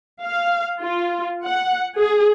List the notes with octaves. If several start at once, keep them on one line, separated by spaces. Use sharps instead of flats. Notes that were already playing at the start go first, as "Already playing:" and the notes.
F5
F4
F#5
G#4